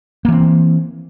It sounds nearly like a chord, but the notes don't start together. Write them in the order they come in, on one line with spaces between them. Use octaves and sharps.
A#3 E3 C4